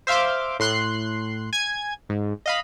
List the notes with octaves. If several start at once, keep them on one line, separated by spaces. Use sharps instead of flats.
C5 E5 F5 C6 D6
A2 C6 F#6 C7
G#5 G#6
G#2
D#5 F5 B5